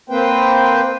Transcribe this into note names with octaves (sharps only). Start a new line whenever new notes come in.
A#3 C4 B4 C5 G5